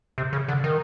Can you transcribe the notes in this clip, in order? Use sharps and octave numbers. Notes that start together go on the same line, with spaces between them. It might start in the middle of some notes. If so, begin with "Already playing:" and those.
C3
C#3
D3
D#3